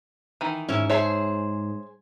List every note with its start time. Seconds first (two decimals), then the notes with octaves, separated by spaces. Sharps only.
0.41 D#3 E3
0.69 G#2 C#4 E4
0.90 G#4 C5 C#5 E5 A5